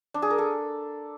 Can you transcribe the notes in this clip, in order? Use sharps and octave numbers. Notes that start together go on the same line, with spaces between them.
D4
G#4
A#4
A4